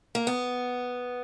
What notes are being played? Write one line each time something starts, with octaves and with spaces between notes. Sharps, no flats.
A#3
B3